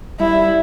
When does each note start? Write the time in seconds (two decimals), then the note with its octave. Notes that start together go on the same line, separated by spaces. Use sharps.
0.20 G3 E4
0.35 G3